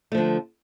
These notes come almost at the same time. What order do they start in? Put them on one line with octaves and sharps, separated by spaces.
A3 F3 D3